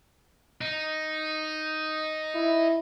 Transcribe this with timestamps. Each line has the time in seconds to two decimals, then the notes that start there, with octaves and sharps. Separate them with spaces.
0.61 D#4
2.35 E4